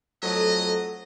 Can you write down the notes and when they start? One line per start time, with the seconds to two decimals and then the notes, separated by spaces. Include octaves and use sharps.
0.23 F2 F#3 A3 D#5